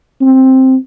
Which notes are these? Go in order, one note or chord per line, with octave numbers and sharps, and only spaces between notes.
C4